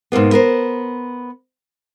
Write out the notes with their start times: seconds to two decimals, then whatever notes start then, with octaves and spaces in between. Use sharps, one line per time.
0.12 G#2 B2 A#3 B3
0.32 B3 A#4 C5